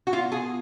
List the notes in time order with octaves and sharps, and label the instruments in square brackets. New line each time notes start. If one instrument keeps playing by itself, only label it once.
[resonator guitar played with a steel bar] F#4
[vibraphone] B3 [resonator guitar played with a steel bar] F4
[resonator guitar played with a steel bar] G#4
[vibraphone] F4 A#4 F5